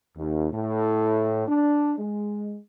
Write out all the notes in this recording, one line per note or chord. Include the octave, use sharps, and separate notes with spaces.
D#2
A2
D4
G#3